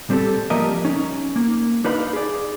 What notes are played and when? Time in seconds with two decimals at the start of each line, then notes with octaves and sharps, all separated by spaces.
0.10 G3 C4 G4 A4
0.50 F3 G3 A#3 A#4 D#5 E5
0.85 C#4 D#4
1.36 A#3
1.84 D4 D#4 B4 F5 B5 C6
2.13 G#4 D5